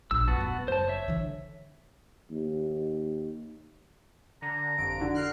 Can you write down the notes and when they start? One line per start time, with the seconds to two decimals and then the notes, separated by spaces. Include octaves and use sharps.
0.11 A#1 E6
0.28 F#2 B3 F#4 A5
0.40 D#1
0.68 F#1 C5 A5
0.88 C#5 E5
1.08 D3 E3
2.31 D#2
4.42 D3 A#5
4.77 G1 F2 D7
5.00 D3 F#4
5.15 A#4 F6 F#6 C7